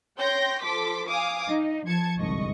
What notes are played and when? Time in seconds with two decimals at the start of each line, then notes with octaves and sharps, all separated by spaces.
0.18 C#5 G5 C6 G6 A#6
0.62 F3 A4 C6 D6 B6
1.09 F5 G#5 D6 D#6
1.48 D#4
1.87 F3 A5 G#6 C#7
2.18 G1 C2 G#2 D#5 C#6